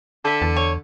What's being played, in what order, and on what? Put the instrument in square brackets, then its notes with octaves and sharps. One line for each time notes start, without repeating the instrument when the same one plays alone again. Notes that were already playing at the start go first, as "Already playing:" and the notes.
[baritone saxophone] D3 [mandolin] A4 E5
[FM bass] E2 [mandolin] A5
[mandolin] C#5